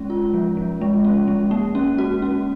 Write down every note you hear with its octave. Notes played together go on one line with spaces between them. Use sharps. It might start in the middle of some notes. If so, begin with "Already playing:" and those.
Already playing: G#3 C#4
F4
F3
F3
G#3
C#4
G#3
A#3
C#4
F#4
C#4